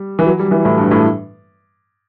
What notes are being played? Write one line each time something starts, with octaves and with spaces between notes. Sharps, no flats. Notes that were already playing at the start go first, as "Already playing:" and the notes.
Already playing: G3
E3
F#3
G3
E3
A2
G2
A2